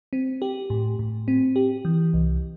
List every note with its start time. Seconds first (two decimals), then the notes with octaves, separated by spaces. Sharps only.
0.13 C4
0.42 G4
0.70 A2
0.99 A2
1.28 C4
1.56 G4
1.85 E3
2.13 C2